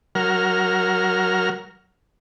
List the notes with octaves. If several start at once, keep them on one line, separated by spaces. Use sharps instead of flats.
F#3 A#4 F6